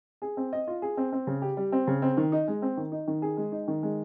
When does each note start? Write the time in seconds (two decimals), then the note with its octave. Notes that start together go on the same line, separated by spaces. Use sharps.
0.22 G#4
0.37 C4
0.53 D#5
0.67 F4
0.82 G#4
0.97 C4
1.12 C4
1.27 C#3
1.42 G4
1.57 G3
1.72 C4
1.87 C#3
2.02 C4
2.17 D#3
2.32 D#4
2.48 G#3
2.62 C4
2.77 D#3
2.92 D#4
3.07 D#3
3.22 G#4
3.37 G#3
3.52 D#4
3.68 D#3
3.83 G#3